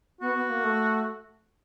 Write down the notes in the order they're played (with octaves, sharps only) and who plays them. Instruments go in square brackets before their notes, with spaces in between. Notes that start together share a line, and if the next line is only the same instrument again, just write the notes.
[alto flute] B3 [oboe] F#4
[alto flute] B3
A#3
A3